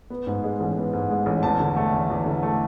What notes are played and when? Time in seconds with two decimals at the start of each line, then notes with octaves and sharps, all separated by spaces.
0.10 B3
0.27 G#2
0.44 G#3
0.60 A1
0.77 B3
0.93 G#2
1.10 G#3
1.26 A1
1.43 E2 A5
1.60 D3
1.76 A3
1.93 E2
2.10 E2
2.26 D3
2.43 A3